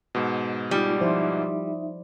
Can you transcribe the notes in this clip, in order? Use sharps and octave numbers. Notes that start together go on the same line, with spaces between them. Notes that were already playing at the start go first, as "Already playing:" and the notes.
G#2 B2
G3 G#3 D#4 F4
F3 D#4 E4 C5 E5